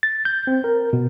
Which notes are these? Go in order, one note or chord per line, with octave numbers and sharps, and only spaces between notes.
A6
G6
C4
A#4
B2